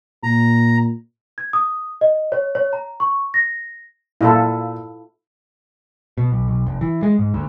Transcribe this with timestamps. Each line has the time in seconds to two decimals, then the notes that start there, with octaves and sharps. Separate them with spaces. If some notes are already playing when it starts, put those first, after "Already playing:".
0.23 A#2 A#5
1.38 G#6
1.53 D#6
2.01 D#5
2.32 C#5
2.55 C#5
2.73 A#5
3.00 C#6
3.34 A#6
4.21 A#2 E4 F4 A4
6.18 B2
6.32 B1
6.48 B1
6.67 F1
6.81 E3
7.03 G#3
7.19 G#2
7.34 D2